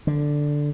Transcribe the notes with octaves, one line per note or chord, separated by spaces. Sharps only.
D3